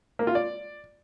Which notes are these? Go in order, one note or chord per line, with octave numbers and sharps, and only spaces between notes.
A#3
F4
D5